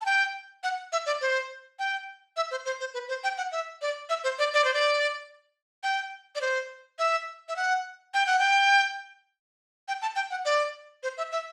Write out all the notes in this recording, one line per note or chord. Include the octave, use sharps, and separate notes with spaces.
A5
G5
F#5
E5
D5
C5
G5
E5
C5
C5
C5
B4
C5
G5
F#5
E5
D5
E5
C5
D5
D5
C5
D5
G5
D5
C5
E5
E5
F#5
G5
F#5
G5
G5
A5
G5
F#5
D5
C5
E5
E5